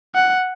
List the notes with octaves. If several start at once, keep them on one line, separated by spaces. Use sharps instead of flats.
F#5